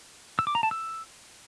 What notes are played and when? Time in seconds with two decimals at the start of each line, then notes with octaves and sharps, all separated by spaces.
0.39 E6
0.47 D6
0.55 A#5
0.63 A5
0.71 E6